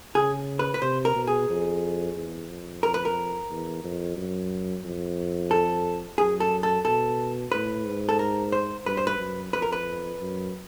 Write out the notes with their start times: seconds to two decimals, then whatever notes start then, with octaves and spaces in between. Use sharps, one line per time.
0.15 C#3 G#4
0.59 B4
0.74 B4
0.82 C3 C5
1.05 A#4
1.16 B2
1.27 G#4
1.50 F2
2.16 E2
2.50 F2
2.83 F2 A#4
2.94 B4
3.05 A#4
3.50 E2
3.84 F2
4.17 F#2
4.84 F2
5.51 A4
6.18 F#2 G#4
6.40 A4
6.63 A4
6.85 B2 A4
7.52 A2 B4
7.85 G#2
8.09 A4
8.19 A#4
8.52 C5
8.86 G2 B4
8.97 C5
9.07 B4
9.19 F#2
9.53 F2 B4
9.62 A#4
9.72 B4
10.20 F#2